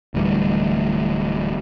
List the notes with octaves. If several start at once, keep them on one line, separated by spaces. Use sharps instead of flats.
D1 D2 E3 G3